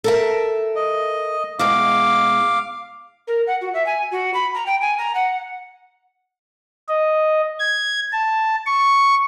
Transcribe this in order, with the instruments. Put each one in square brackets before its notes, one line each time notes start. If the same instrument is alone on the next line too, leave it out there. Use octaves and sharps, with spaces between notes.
[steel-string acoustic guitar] A4 A#4 E5
[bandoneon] D#5
[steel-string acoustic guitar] B2 E3 G#3 [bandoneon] F5 D6
[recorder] A#4
F#5
F#4
E5
G#5
F#4
B5
A#5
G5
G#5
A#5
F#5
[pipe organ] D#5
G#6
A5
C#6